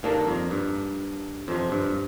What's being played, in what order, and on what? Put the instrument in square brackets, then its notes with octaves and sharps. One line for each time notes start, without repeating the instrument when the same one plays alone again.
[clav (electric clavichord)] G2 [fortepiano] D#3 A#3 D4 A4
[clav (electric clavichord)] F2
G2
[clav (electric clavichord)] F2 [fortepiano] C3 F3 C4
[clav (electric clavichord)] G2